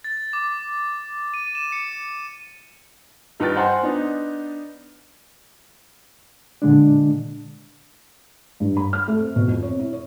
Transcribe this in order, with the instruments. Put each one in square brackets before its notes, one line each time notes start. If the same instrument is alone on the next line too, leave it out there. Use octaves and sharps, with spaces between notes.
[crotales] A6
D6
D#7
E7
C#7
[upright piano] G2 D#4 B4 G5 F6 A6
C5 F#5 G#5 A#5 C6
B3 D4 D#4
[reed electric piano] A#2 D3 G#3 D4
[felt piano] G2
B5
F6
A3
C4
B2
F2
C#5
E4
C#5